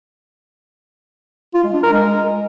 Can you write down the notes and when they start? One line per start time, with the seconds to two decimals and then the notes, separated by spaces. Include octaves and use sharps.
1.54 F4
1.64 G#3
1.73 D4
1.83 A#4
1.93 G#3